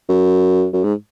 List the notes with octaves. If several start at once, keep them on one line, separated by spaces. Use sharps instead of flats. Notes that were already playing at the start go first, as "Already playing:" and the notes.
F#2
F#2
G#2